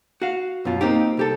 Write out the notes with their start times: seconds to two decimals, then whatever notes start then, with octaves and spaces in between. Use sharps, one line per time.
0.22 F#4 F5
0.65 F#2 B2 F4
0.81 A#3 C4 D#4 G4
1.17 C2 G4 A4